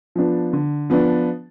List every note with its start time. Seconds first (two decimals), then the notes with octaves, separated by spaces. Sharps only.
0.15 F3 B3 D4
0.53 D3
0.90 F3 B3 D4